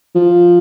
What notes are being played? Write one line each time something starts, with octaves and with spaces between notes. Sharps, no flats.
F3